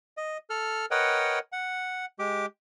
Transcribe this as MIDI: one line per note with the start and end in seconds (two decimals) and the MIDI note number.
0.17 0.38 75
0.50 0.86 69
0.50 0.86 89
0.91 1.39 70
0.91 1.39 71
0.91 1.39 73
0.91 1.39 75
0.91 1.39 78
0.91 1.39 79
1.52 2.06 78
2.19 2.46 56
2.19 2.46 67
2.19 2.46 86